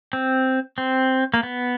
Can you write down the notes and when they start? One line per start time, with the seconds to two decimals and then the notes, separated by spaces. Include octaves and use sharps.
0.13 C4
0.78 C4
1.34 A#3
1.43 B3